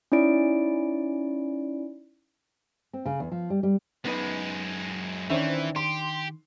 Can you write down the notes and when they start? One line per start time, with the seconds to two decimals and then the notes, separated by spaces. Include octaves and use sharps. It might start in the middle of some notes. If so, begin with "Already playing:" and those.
0.12 C#4 D#4 E4 D5 D7
2.93 C4
3.06 C#3
3.20 E2
3.32 F3
3.50 G3
3.63 G3
4.05 F#2 G#3 B3 D#4 B4
5.30 D#3 E3 C#4 D4 C5 E5
5.76 G4 C6